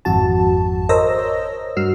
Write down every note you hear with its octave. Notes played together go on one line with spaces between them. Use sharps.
G#1 F2 F#4 A5
A#4 C5 C#5 D#5 E6 A#6
G2 F#4 E6 F6 C7